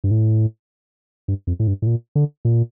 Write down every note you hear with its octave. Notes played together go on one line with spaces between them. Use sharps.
G2
A2
G2
F2
A2
G2
A2
A#2
D3
A#2